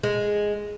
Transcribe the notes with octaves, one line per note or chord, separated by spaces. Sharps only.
G#3